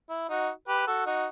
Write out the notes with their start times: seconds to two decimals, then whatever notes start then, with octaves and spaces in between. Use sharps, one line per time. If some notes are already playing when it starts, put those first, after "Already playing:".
0.09 E4
0.29 D#4 F#4
0.68 G4 B4
0.87 F#4 A4
1.06 D#4 F#4